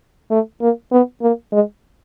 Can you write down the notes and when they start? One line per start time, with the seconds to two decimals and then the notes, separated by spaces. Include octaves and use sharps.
0.31 A3
0.61 A#3
0.91 B3
1.22 A#3
1.52 G#3